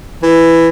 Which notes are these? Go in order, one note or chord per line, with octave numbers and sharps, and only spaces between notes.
E3